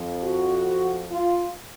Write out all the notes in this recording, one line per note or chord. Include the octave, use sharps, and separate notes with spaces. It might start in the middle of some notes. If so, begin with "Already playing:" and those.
Already playing: F2 F3
F#4
F4